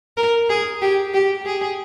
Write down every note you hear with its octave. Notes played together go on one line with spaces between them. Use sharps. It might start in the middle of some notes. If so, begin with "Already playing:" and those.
A#4
G#4
G4
G4
G#4